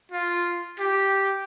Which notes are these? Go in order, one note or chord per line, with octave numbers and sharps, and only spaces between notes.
F4
G4